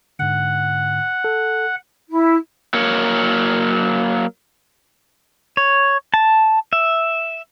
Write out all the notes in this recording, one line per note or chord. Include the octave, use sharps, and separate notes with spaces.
G#2 D3 F#5
A4
E4
F#3 A#3 A#4 C#5
C#5
A5
E5